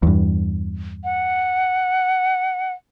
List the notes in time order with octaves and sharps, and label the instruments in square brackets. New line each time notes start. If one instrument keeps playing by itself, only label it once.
[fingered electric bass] E2 G2
[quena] F#5